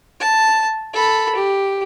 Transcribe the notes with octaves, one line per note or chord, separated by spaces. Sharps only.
A5
A4 B5
G4